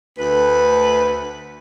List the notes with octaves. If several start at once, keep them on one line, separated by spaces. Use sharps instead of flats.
D2 B4